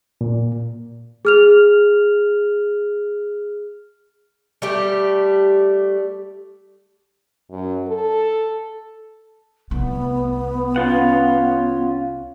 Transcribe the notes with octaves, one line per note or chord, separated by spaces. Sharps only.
A#2
G#4 F6 F7
G3 A3 G4
F#2
A4
C2 A3 B3
C#4 F4 F#5